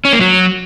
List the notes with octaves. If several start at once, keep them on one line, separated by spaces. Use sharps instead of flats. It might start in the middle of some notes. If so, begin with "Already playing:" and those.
C#4
A#3
F#3